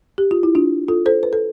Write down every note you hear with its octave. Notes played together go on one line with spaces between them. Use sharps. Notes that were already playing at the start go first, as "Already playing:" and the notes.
G4
F4
E4
D4 F4
F4 A4
A4 C5
B4
A4